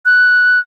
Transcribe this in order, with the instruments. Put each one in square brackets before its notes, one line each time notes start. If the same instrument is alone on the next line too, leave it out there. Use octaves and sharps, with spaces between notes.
[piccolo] F#6